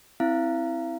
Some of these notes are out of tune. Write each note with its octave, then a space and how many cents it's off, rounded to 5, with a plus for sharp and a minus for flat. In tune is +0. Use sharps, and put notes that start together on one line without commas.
C4 +0 E4 -10 F5 -45